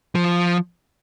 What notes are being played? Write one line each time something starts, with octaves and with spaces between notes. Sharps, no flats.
F3